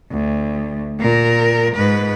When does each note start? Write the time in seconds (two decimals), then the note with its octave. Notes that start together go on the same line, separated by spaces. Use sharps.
0.11 D2
1.00 A#2 A#4
1.75 G#2 B4